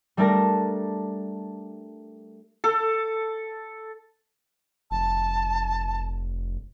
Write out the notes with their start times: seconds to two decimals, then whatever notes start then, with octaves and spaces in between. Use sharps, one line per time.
0.17 G3 A3 D4 A#4 A5 A#6
2.64 A4
4.91 F1 A5